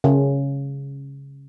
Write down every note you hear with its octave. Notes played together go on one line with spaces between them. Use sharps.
C#3